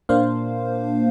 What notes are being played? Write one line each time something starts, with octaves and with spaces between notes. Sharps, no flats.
A#2 A#3 D4 C5 F5